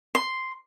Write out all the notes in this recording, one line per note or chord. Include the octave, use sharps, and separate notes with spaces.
C6